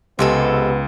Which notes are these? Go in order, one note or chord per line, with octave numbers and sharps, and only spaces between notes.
C#2 C3 G#3 B3 A4